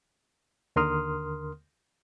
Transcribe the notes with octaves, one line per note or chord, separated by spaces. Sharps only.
D#2 D3 A#4 C6 D#6 F6